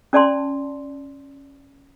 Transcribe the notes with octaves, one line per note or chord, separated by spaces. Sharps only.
C#4 D5 A5 C6